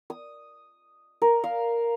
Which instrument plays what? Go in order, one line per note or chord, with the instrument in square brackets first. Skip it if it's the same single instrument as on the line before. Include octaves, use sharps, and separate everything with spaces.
[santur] D#6
A#4
F5